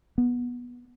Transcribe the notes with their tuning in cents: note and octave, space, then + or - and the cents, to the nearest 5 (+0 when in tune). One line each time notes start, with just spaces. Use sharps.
B3 -15